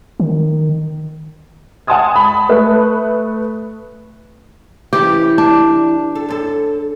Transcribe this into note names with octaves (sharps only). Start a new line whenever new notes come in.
D#3
F#5 G#5 A5 C6 D#6 G#6
A5 B5
A3 B4
E3 C#4 E4 G4
D4
A4
F#2 A4